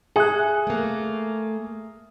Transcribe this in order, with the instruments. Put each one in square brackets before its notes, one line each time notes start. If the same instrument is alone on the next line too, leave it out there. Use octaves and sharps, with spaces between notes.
[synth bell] G#4 F#6 [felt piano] E5 G#5 D#6
[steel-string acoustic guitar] A3 A#3